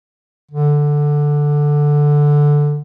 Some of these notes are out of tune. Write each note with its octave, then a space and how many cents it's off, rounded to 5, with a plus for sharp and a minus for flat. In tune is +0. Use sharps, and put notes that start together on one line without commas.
D3 +0